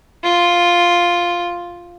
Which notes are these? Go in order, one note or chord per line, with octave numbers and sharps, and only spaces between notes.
F4